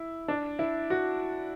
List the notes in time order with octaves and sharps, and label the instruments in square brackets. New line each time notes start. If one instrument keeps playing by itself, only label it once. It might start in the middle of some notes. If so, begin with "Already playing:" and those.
Already playing: [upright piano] E4
D4
E4
F#4